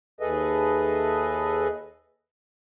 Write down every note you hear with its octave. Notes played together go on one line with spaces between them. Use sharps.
D#2 G#4 A4 B4 D#5 E5